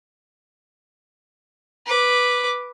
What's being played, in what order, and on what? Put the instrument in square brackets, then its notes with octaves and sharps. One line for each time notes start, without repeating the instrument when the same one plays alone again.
[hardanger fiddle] B4 D6